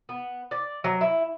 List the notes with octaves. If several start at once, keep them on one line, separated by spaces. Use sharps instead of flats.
B3
D5
F#3
E4